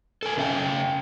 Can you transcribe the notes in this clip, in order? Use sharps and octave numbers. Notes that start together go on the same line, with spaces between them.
A4 A#4 G#5
C#3 C#4 G#4 D#5 F5 G5